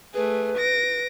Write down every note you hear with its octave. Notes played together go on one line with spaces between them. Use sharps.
A3 G#4 B4
A#6 D7